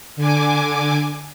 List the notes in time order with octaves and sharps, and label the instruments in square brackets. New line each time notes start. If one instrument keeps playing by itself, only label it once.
[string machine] D3 G#5 D6